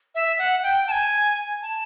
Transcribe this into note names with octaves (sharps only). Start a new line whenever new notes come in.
E5
F#5
G5
A5
G#5
A5